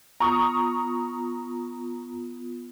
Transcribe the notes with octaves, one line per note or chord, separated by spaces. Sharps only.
B3 F4 A#5 C#6 D#6